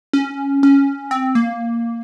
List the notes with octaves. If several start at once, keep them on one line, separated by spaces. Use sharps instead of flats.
C#4
C#4
C4
A#3